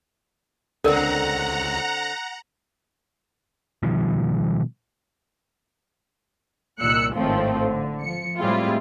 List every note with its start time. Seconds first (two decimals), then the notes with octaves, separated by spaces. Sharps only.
0.84 C#2 D3 C4 A4 A#4 D5 F#5 A#5
3.83 B2 D#3 F3 G3
6.81 C2 A#2 D#3 E6 F#6 C#7
7.15 G#1 A2 D#3 F3 A3 C4
7.65 D3
8.03 F3 C#7
8.38 A2 G3 G#3 C4 E4 F4